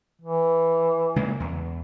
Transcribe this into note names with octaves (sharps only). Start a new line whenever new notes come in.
E3
C#3 G#3 A#3
E2